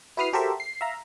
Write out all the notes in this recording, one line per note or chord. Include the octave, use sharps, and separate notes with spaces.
E4 F#4 B4 D#6 F6 C7
F#4 G4 A4 A#4 C5 E5
C7
E5 F5 A#5